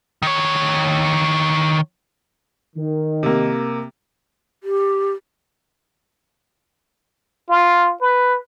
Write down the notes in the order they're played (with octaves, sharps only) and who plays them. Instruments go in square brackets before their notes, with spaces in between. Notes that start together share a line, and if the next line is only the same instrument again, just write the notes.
[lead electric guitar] D#3 C#5
[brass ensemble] D#3
[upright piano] C3 A#3
[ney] G4
[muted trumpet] F4
B4